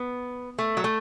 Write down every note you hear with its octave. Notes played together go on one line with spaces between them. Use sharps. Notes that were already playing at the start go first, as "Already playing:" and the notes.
Already playing: B3
A3
F#3
A3